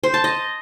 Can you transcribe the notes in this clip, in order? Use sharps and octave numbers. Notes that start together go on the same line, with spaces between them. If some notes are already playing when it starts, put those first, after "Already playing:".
C5
A5
D#5